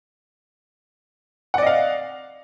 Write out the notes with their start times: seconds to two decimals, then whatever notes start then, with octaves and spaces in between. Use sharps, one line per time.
1.54 F#5
1.58 D5
1.62 D#5
1.66 F5